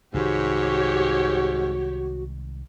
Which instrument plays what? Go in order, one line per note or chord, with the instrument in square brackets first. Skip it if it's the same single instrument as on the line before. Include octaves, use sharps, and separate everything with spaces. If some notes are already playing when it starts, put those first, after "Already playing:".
[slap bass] C2 D#3 G#3 [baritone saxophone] G#2 [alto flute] F#4 [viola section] G4 C#5